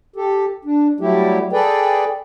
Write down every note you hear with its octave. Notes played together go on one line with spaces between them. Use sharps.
G4 A4
D4
F#3 G3 A3 E4 G4
G#4 A4 B4 D5 G5